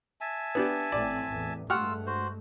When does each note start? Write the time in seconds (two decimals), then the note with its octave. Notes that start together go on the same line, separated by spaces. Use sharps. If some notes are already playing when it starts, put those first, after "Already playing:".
0.21 E5 G#5 A5
0.55 B3 D4 G4
0.92 A1 A2 C4 D5
1.27 A1 E2
1.70 G2 G#3 A3 F4 F#5 C#6 E6 F6
2.06 F#4 C5